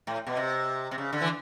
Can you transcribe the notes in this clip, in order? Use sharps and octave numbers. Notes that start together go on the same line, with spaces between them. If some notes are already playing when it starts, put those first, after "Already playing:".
A2
B2
C3
C3
C#3
D3
E3